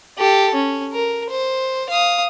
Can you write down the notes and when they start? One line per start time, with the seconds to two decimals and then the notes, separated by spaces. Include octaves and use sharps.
0.18 G4 A4
0.54 C#4
0.93 A#4
1.30 C5
1.89 F5 D#6